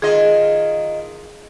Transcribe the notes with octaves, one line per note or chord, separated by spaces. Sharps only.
D#3 F4 G#4 D#5